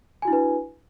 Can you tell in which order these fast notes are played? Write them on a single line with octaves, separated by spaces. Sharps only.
G#5 F#4 E4 D4 B4